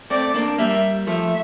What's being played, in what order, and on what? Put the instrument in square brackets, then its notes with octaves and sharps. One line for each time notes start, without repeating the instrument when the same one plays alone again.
[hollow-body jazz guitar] A3 C4 [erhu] D5
[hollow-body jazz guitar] A#3 D4
[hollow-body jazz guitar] G3 A#3 [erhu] E5
[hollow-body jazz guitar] F3 A3 [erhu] E5